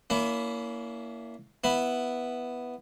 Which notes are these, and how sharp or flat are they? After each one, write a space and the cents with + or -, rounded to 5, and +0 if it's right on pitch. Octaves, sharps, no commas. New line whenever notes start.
A#3 +0 C#4 +40 E4 +0
B3 +0 E4 +0